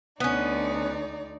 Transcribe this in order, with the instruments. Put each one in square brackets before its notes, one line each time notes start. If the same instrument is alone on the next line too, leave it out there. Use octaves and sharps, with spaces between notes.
[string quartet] D2 D#4 D5 [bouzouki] B3 C#4